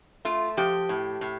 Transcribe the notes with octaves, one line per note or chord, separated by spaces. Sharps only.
A3 F4
F3 G4
A2
A2